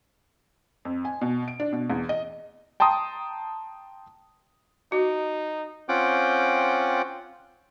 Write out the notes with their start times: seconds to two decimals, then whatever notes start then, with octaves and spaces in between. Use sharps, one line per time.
0.85 F2
1.05 G#5
1.21 B2
1.48 D7
1.60 D4
1.72 B2
1.90 E2
2.09 D#5
2.80 G5 A5 A#5 C6 D#6
4.92 D#4 F#4
5.89 C4 C#4 F4 F#5 G5 D6